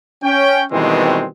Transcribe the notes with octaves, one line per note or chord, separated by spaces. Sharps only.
C#4 G5
B2 D#3 E3 G3 G#3 C4